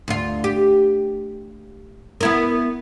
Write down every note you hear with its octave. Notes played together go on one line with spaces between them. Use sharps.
D2 F4
G4
B3 E4 A#4